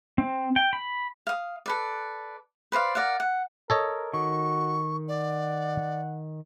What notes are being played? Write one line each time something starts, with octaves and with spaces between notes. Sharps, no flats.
C4
G5
B5
F5 D#6
A4 B4 D5
B4 C5 D5 F5
A#4 D5 F5 F#5
F#5
A4 A#4 C#5 D#5
D#3 F#4 C#6
D5 F#5